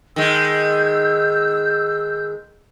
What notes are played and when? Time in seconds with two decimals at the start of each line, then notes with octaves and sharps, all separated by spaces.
0.16 D#3 G#3 E6 G6